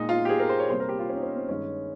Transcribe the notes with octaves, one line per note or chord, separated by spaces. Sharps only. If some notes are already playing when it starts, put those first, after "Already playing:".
Already playing: A#2 G#3 D#4
F4
G4
G#4
A#4
C5
C#5
C3 G3 A#3 C5
A#4
G4
F4
C#4
D#4
C#4
C4
G2 D#3 G#3 C#4